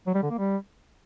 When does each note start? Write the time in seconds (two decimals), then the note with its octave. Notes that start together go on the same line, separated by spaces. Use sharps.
0.07 F#3
0.15 G3
0.22 D3
0.30 A#3
0.38 G3